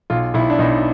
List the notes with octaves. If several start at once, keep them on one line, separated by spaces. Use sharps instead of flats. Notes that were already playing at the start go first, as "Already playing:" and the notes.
B1 F4
B1 E4
D4
B1 D#4